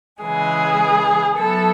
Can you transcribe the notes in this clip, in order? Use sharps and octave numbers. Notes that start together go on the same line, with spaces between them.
C#3 E3 G#3 G#4
F#3 B3 E4 A4